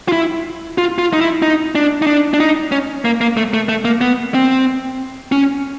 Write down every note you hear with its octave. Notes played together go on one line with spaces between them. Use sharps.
F4
E4
F4
F4
D#4
E4
D#4
D4
D#4
D4
D4
D#4
C#4
A#3
A#3
A3
A3
A3
A#3
B3
C4
C#4